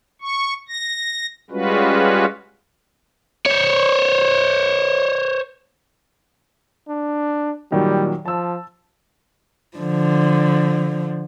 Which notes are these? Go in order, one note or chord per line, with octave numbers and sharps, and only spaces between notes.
C#6
A#6
G3 G#3 C#4 F4 F#4 B4
C5 C#5
D4
A#2 D#3 F#3 G3
F3 A5 E6
D3 F3